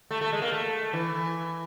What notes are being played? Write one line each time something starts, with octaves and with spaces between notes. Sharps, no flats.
A3
A3
G#3
A#3
A3
E3